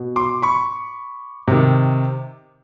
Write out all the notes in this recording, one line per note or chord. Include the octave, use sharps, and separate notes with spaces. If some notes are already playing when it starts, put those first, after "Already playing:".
Already playing: B2
C6 D6
B5 C#6
C3 D#3